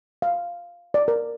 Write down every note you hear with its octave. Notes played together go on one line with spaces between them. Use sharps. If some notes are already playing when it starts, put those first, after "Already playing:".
F5
D5
A#4